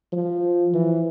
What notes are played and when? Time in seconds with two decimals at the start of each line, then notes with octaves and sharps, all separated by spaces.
0.13 F3
0.74 E3